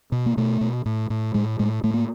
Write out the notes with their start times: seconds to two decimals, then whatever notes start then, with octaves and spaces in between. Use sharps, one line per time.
0.12 B2
0.26 A#3
0.37 B2 A3
0.61 B2
0.86 A2
1.10 A2
1.34 A2 G#3
1.59 A2 G#3
1.83 A2 A3
1.94 A#3